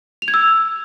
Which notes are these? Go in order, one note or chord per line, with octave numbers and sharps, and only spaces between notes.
F7
G#6
E6